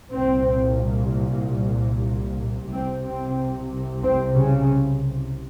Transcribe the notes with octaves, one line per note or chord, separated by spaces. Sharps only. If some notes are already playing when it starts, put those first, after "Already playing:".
C2 A#2 C4
C2 C3 C4
C4
C4
C#3